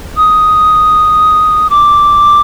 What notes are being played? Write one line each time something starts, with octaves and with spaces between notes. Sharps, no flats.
D#6
D6